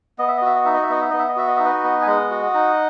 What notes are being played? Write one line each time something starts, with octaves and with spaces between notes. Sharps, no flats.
B3 D#5
E5
D#5
F#4 E5
D#5
D#4 E5
D#5
E5
B3 D#5
E5
B3 D#5
E5
D#5
F#4 E5
D#5
D#4 E5
B4 D#5
B3
G#5
G#3 D#5 F#5
F#4
D#4